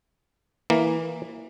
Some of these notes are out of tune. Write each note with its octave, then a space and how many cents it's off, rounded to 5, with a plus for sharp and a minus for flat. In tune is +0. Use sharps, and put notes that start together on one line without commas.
E3 -10 A#3 +0